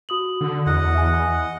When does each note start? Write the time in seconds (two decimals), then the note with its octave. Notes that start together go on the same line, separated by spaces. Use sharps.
0.09 F#4 D#6 F#7
0.41 D3
0.66 E2 D#5 F#5
0.94 E5 G#5